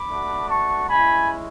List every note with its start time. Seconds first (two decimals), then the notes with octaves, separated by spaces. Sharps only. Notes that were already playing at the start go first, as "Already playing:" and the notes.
Already playing: B5 D6
0.11 A3 D4 F#4
0.49 A5 C#6
0.89 G#3 C#4 E4 G#5 B5